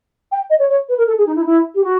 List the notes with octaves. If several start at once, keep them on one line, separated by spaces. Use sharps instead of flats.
G5
D#5
C#5
C#5
B4
A#4
A4
G#4
D#4
E4
D#4
E4
G4
F#4